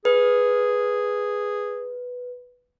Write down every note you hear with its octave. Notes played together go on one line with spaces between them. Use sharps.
G#4 B4